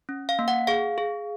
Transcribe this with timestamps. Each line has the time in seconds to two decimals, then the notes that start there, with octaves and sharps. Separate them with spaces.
0.09 C#4
0.29 F5
0.39 A#3
0.48 F#5
0.67 G#4 F5
0.98 G#4